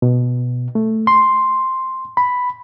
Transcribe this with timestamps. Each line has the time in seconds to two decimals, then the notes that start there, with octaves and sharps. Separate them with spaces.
0.02 B2
0.75 A3
1.07 C6
2.17 B5